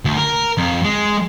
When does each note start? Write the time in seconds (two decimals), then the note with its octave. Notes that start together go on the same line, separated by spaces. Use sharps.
0.05 D2
0.17 A#4
0.58 F2
0.84 G#3